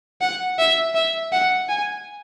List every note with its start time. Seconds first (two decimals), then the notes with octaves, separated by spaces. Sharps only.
0.21 F#5
0.58 E5
0.95 E5
1.32 F#5
1.69 G#5